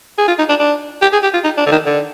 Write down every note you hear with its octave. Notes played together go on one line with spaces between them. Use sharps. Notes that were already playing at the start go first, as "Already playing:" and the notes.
G#4
F4
D#4
D4
D4
G4
G#4
G4
F4
D#4
D4
D3
D#3
D3